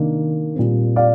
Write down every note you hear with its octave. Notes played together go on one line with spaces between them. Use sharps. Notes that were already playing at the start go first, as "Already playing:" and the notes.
Already playing: C3 D#3 A#3 D4
A#2 G3 C4
D5 F5